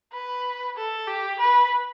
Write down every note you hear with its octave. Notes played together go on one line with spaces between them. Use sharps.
B4
A4
G4
B4